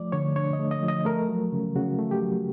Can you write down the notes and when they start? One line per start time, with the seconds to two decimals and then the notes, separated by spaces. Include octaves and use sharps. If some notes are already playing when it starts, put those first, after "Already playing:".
Already playing: F3 A3 D5
0.12 D3 C#5
0.36 D4 C#5
0.53 D#5
0.59 A3
0.71 D#5
0.83 F3
0.88 D#5
1.05 A3 A#4
1.29 F#3
1.52 C#3
1.76 C#3 F#4
1.99 A3
2.11 G4
2.22 F#3